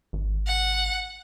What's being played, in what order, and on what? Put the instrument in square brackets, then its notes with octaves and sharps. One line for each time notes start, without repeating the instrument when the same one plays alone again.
[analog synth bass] G#1
[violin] F#5